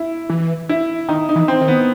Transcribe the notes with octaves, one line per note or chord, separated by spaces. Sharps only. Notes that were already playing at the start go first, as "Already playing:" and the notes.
Already playing: E4
E3
E4
D#3 D#4
D#4
E3
C4
D#3
B3